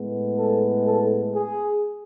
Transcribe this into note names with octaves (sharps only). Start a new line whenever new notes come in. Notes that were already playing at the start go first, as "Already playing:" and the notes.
Already playing: A2 G#3 B3
A4
A4
G#4